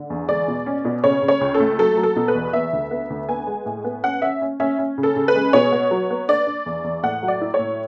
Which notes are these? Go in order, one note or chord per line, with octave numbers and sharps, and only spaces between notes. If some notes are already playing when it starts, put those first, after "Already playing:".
Already playing: D3
E2
G#3 D5
B2
C#4
B2
C#3 C#5
C#3
C#5
C#2
A4
A3
F#3 A4
F#3
A4
B2
B4
E2
B3 E5
D2
B3
D2
B3 G#5
G#3
A2
B3
C#4 F#5
C#4 E5
C#4
C#4 E5
C#4
C#3
A4
C#3
B4
G#3
B2 C#5
B3
F#3
B3
D4 D5
D4
E2
E2
A2 F#5
F#3
D5
E4
C#5
A2